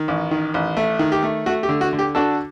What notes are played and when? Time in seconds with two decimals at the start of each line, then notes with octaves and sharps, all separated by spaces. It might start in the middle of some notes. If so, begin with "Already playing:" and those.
Already playing: D#3
0.08 A1
0.31 D#3
0.54 A1
0.77 A3
0.99 D#3
1.12 G4
1.23 A3
1.46 A3 F#4
1.63 G4
1.69 D3
1.81 F#4
1.93 D3
1.99 G4
2.15 D4 F#4 A4